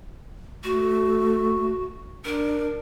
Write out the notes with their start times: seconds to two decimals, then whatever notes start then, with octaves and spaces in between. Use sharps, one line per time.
0.64 A3 F#4
2.25 D4 A#4